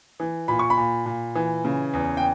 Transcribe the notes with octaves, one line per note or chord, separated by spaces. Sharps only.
E3
A#2 B5
C#6
B5
A#2
A#2
E3
C#3
E2
G5